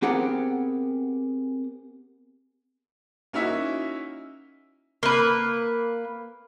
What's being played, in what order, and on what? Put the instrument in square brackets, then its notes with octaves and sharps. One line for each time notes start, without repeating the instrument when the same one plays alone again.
[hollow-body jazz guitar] B3 C4 G4 G#4 A#4 F#5
[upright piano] A#3 C#4 D#4 E4 F#4 E5
[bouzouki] A#3 B4